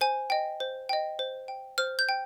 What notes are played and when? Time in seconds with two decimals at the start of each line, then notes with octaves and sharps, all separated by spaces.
0.01 C5 G#5
0.30 D#5 G5
0.60 C5
0.89 D#5 G5
1.19 C5
1.48 G5
1.78 C5 F6
1.99 G6
2.09 G5